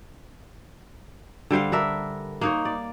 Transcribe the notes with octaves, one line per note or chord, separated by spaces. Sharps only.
D3 G3 C5 F5
D4 A#4 E5
A#3 D#4 C#5
D5